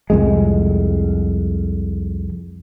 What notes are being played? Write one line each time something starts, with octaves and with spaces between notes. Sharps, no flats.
C2 F2 G#3